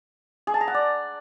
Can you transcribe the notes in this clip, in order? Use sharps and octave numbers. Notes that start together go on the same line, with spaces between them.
G#4
A5
A#5
F#5
D5